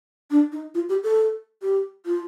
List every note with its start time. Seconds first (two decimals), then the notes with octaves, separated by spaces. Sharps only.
0.30 D4
0.52 D#4
0.75 F4
0.89 G4
1.04 A4
1.62 G4
2.06 F4